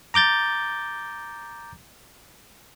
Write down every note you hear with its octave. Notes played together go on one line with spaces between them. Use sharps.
A#5 D6 G6 A6